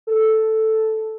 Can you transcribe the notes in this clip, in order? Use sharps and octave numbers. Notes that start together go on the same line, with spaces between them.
A4